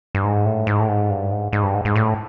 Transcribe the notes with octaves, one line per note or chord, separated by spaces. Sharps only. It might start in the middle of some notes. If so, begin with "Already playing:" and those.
G2
G#2
A2
G#2
A2
G#2
G2
G#2
G#2
G2
G#2
G#2
A2